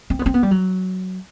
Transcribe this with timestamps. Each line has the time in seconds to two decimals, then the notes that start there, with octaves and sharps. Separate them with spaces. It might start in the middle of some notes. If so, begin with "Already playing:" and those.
0.10 C4
0.19 B3
0.26 C4
0.34 B3
0.43 G3
0.51 F#3